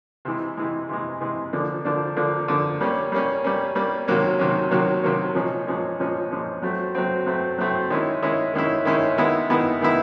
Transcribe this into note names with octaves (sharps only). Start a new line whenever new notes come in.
C3 E3 G#3
C3 E3 G#3
C3 E3 G#3
C3 E3 G#3
D3 F3 A#3 D4
D3 F3 A#3 D4
D3 F3 A#3 D4
D3 F3 A#3 D4
G3 A#3 C#4
G3 A#3 C#4
G3 A#3 C#4
G3 A#3 C#4
C3 D#3 F#3 A#3 C#4
C3 D#3 F#3 A#3 C#4
C3 D#3 F#3 A#3 C#4
C3 D#3 F#3 A#3 C#4
A#2 F3 G#3 C#4
A#2 F3 G#3 C#4
A#2 F3 G#3 C#4
A#2 F3 G#3 C#4
F#3 A3 C4
F#3 A3 C4
F#3 A3 C4
F#3 A3 C4
D#3 G#3 C#4 E4
D#3 G#3 C#4 E4
D#3 G#3 C#4 E4
D#3 G#3 C#4 E4
D#3 G#3 B3 E4
D#3 G#3 B3 E4
D#3 G#3 B3 E4